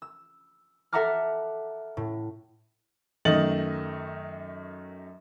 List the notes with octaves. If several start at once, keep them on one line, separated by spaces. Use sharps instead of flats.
E6
A4 E5 F#5 A#5 D6 F6
A2
F#2 D#3 A3 D#5 A6 F#7